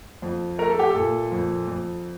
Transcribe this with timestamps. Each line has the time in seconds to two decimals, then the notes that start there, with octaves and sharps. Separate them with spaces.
0.22 F2
0.58 A3 A#4
0.69 A4
0.79 G4
0.90 A4
0.95 A#2
1.32 F2
1.68 F2